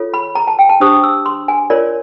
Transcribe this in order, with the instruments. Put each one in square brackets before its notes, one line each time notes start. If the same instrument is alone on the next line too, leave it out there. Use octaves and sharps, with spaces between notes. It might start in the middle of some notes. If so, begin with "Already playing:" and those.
Already playing: [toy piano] F4 A4 C#5
B5
A#5
A5
G5
A5
D4 G4 C5 D#6
E6
C6
G#5
F4 A#4 C#5 D5